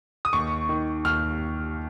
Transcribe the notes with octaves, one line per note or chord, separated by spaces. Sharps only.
D#6
D#2 C#6
D#3
D#2 F6